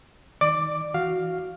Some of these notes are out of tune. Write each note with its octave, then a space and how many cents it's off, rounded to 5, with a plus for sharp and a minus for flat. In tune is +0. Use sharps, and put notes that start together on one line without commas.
D#3 +25 D5 +25 D6 +0
E3 +0 F#4 +0 F5 +0